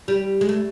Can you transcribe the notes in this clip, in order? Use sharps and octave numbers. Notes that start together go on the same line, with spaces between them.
G3
G#3
A3